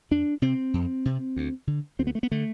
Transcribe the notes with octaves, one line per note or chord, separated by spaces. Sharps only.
F2 D4
C3 C4
F2
C3
D2
D3
D2 C4
B3
A3
B3
D3 A3